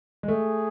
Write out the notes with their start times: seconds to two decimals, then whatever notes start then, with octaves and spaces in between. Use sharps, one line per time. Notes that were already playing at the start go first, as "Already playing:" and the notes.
0.23 G#3
0.28 A3 G#4